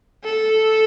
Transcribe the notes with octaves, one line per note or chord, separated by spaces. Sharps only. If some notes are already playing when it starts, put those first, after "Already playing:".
A4